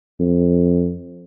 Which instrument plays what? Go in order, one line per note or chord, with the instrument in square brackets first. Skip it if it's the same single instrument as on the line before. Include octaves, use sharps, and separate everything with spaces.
[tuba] F2